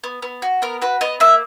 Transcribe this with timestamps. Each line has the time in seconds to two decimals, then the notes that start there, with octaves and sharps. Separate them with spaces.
0.04 B3
0.22 B3
0.42 F#4
0.62 B3 A#4
0.82 F#4 B4
1.01 B3 D#5
1.20 A#3 E5